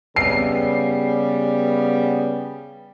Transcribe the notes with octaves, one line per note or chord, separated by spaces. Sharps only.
C#3 G3 B3 C7